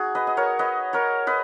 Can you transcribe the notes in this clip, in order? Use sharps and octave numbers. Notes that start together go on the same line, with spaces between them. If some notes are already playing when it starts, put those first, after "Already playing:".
Already playing: D#4 F#4 G#4
B4 D#5
D#5
A#4 C#5
B4 D#5
A#4 C#5
B4 D#5